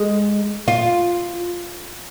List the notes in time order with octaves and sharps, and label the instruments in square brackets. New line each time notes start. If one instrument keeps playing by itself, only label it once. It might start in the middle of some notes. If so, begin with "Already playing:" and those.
Already playing: [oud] G#3
F4